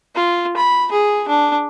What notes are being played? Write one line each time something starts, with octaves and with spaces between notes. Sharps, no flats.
F4
B5
G#4
D4